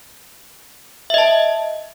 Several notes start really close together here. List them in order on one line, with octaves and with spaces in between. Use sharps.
E5 D#5 A5